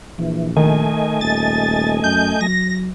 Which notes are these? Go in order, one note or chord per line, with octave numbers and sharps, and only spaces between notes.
A#1 E3
D#3 A3 D#5 G#5
D#1 A6
F#2 G6
F#3 A#6